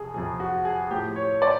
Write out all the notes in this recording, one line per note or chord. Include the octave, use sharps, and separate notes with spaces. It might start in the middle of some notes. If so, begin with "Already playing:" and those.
Already playing: F2 C3 G#4
F2 C3 F3 G#4
F#4
G#4
A2 F3 G4
C#5
D5